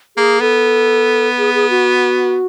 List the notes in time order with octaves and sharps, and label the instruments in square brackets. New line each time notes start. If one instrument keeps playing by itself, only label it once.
[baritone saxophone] A#3 [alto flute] G#4
[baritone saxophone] B3 [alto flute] A4
[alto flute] G#4
G#4
F#4